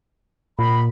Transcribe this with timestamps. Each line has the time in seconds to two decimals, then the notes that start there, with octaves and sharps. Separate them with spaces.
0.59 A#2 B5